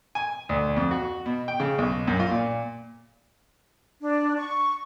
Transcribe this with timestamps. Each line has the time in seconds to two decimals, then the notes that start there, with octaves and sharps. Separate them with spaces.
0.15 G#5
0.49 D2
0.76 F2
0.91 F#4
1.26 B2
1.48 G5
1.60 C#3
1.78 B1
2.08 F#2
2.20 F4
2.31 A#2
4.01 D4
4.37 C#6